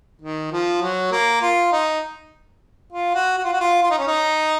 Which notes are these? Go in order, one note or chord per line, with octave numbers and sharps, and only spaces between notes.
D#3
F3
F#3
A#3
F4
D#4
F4
F#4
F#4
F4
F#4
F4
F4
D#4
C#4
D#4